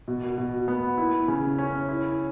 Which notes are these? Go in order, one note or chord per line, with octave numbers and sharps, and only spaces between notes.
B2
B2
B3
E4
C#3
C#4
E4